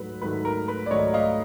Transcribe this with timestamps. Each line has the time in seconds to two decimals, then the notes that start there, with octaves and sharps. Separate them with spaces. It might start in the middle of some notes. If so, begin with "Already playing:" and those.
Already playing: G#2 F#3 A3 B4
0.21 G#2 D#3 F#3 A3 B4
0.45 A#4
0.68 B4
0.86 D5
0.91 G#2 D#3 F#3 A3 C#5 D#5
1.14 D#5 F5